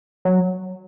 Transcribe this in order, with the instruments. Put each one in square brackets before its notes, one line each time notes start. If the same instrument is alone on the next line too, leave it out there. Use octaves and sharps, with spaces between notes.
[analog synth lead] F#3